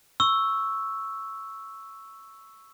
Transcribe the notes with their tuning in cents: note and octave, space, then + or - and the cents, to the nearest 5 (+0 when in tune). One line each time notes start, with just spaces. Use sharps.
C#6 +0 E6 +0